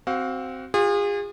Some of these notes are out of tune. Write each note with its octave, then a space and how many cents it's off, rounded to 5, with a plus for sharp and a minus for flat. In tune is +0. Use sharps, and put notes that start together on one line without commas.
C4 +0 F#4 +25 F5 +30
F4 +30 G#4 -35